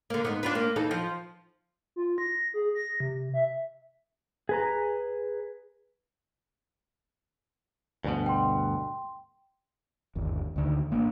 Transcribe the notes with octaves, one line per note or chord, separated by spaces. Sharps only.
D3 A#3
G#2 B3
D4 F4 B4
A#3
E3 D#4 A4
F3
F4
A#6
G#4
A#6
C3
E5
G#4 B4 A#5
D2 G2 B2
G5 C6
G1 D#2
D2 D3 D#3
G#1 A#3 C4 D4